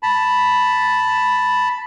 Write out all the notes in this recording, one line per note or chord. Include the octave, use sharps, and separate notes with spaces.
A5 B5